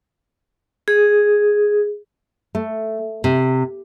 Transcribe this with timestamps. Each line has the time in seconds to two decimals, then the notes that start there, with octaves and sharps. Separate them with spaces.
0.88 G#4
2.55 A3
3.24 C3